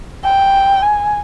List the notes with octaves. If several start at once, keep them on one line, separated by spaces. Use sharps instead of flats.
G5
G#5